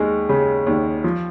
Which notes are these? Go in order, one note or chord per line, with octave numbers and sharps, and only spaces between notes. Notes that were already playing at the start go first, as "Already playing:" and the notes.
Already playing: D#2 G#3
C#3
D#2
F3